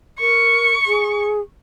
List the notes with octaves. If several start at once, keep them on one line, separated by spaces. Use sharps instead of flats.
A#4 C#6
G#4